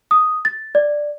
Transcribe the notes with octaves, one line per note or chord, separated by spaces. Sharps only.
D#6
A6
D5